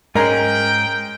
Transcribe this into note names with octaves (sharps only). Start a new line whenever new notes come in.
G#2 G#3 C#4 G#4 A#4 G5 A#5